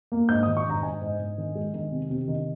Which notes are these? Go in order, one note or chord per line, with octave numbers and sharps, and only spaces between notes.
A#3
G#2 G6
D#3 D#6
C#6
G#2 A#5
G#2 G#5
G#2
G#2
D#3
G#3
D#3
C3
C3
D#3